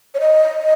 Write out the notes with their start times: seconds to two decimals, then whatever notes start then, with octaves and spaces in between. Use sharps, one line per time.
0.14 C#5
0.21 D#5
0.60 D#5